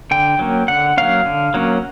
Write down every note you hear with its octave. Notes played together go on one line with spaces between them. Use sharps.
D3 G5
F#3 A#3 C#4
D3 F#5
F#3 A#3 C#4 F5
D3
F#3 A#3 C#4